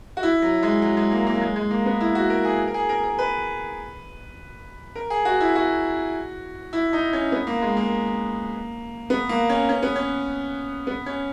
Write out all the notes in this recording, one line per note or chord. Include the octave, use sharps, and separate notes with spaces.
F#4
E4
F#3
G#3
F#3
G#3
A#3
A#3
F#3
G#3
G#3
A#3
B3
E4
F#4
A#4
G#4
A#4
G#4
A#4
A#4
B4
A#4
G#4
F#4
E4
F#4
E4
D#4
C#4
B3
A#3
G#3
A#3
B3
A#3
C#4
C#4
B3
C#4
B3
C#4